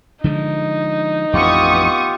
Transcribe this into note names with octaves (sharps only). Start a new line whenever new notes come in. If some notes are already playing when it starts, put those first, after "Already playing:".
D3 F3 G#3 D#4
A1 F2 B3 F4 G4 C#6 D#6